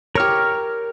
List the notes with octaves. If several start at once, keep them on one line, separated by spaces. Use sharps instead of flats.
G4 A#4 C#5 F6